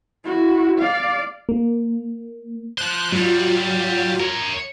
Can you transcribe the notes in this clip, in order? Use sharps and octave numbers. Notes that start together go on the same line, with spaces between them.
E4 F#4
D5 F5
A#3
F3 C5 F#6
G#2 F#3 G3 F4
A#4 C#5